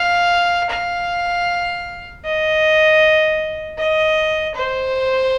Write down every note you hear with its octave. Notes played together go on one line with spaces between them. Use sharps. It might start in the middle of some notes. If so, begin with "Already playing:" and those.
Already playing: F5
F5
D#5
D#5
C5